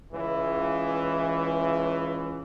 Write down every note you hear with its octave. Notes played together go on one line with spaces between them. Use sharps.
C#2 E3